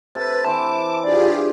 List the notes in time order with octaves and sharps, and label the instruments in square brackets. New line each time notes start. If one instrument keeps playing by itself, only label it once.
[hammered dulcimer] C3 A4 [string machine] B4 [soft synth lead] A6
[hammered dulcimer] E3 C4 [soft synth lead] A5 [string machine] D6
[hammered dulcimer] D4 [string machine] F4 G4 G#4 [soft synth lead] D5